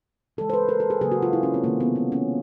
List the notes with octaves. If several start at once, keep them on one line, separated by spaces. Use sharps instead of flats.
C#3 E3 G#3 A4
C5
B4
A#4
A4
G#4
C#3 F#3 A#3 G#4
F#4
F4
E4
C#4
C4
C3 D#3 G#3 A#3
B3
C4
C#4